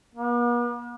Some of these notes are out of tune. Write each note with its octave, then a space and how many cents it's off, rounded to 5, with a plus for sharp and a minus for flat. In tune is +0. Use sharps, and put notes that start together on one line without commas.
B3 -45